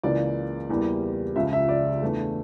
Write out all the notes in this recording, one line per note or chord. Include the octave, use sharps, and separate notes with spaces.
C#2 C#3 E3 A#3 D5
E2 E3 G3 A#3
C#2 C#3 F3 E5
E5
D5
E2 E3 A3 D4